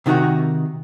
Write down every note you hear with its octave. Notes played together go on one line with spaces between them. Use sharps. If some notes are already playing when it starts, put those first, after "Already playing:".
C3 D#3 D#4 F#4 F#5